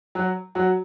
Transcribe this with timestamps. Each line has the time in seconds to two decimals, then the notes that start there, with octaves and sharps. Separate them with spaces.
0.15 F#3 F#4
0.55 F#3 F#4